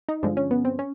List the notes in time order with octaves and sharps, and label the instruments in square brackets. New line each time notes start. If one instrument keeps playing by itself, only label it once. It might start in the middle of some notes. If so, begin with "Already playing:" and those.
[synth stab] D#4
G2 D3 F3 G#3 D4
C#4
B3
C4
C#4